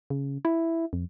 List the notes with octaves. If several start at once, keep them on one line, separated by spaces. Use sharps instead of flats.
C#3
E4
F2